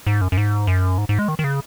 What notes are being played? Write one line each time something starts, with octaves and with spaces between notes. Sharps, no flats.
G#2
F#2
F#2
G#2
F#2
G#2
G#2
G#3
D#3
D#3
C#3